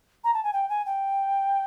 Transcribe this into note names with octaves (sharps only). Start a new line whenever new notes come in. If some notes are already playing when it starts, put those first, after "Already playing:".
A#5
A5
G#5
G5
G#5
G5